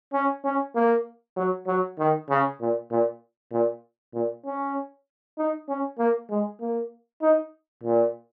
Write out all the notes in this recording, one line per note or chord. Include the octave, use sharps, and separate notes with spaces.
C#4
C#4
A#3
F#3
F#3
D#3
C#3
A#2
A#2
A#2
A#2
C#4
D#4
C#4
A#3
G#3
A#3
D#4
A#2